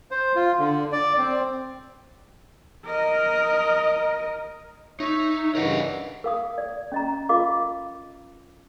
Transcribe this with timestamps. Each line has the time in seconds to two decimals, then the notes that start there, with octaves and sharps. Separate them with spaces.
0.11 C5
0.35 F4
0.59 D3
0.92 D5
1.18 C4
2.86 A#4 D#5
5.00 D#4 C#5 E5
5.55 G2 C#3 E3 A#4 D#5 F#5
6.24 A#4 F5 D#6
6.58 D5
6.92 C#4 D#5 A#5
7.29 F4 A#4 D#5 F5 D6